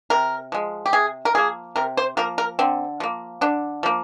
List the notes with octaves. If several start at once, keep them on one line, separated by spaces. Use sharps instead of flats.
C3 A#4
F3 G#3
G4
C3 G#4
A#4
F3 A#3 G#4
C3 A#4
C5
F3 A#3 A#4
A#4
D3 C4
F3 A#3
D3 D4
F3 A#3